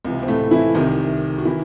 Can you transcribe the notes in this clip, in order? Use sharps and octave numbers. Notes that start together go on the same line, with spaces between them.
C#2 C3 E3
C4
A2 A3
E3 E4
C2 C3 D#3 D#4
F#4
D#3 E3 E4